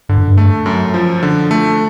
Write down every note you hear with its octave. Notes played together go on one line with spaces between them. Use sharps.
G2 D3
F#2
G2
A3
F#2
F3
D3
A3